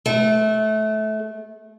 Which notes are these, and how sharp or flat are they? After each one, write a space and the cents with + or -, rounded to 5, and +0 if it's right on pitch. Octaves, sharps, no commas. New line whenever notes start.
A3 -25